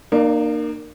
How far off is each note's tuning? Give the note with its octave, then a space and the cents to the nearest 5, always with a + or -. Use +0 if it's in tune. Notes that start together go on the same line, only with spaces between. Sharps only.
A#3 +0 D#4 -45 D5 +0